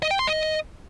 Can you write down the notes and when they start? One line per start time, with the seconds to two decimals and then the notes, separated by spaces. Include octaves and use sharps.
0.02 D#5
0.11 G5
0.19 C6
0.27 D#5